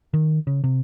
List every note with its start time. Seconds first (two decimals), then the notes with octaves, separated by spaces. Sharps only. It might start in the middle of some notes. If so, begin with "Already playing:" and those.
0.14 D#3
0.47 C#3
0.64 C3